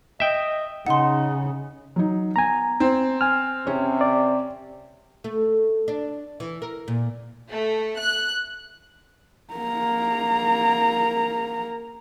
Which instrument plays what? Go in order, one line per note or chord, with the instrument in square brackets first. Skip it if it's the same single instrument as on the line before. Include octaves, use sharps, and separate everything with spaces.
[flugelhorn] D#5 [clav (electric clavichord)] E5 G5
[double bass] C#3 [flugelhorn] D#4 [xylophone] F#5 C6
[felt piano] F#3 D#4
[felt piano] B3 [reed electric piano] G#5 A#5
[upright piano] C4
[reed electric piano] G#5 F6
[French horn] C3 [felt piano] C#4
[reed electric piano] D5
[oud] A3
D4
E3
A#4
A#2
[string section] A3
F#6
[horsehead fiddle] A#3 A#5